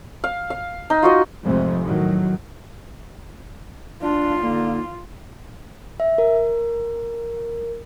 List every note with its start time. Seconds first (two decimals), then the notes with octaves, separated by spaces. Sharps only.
0.24 F5
0.50 F5
0.90 D#4
1.03 F4 F#4 D#5
1.44 F2 G#2 C3 F3 G#3 A3
1.82 A2 D#3 F#3
4.02 D4 F4
4.42 D3 A#3 D#4
6.00 E5
6.18 A#4